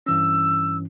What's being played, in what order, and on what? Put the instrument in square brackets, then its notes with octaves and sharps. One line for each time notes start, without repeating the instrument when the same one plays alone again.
[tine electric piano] G2 E3 C#4 [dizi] E6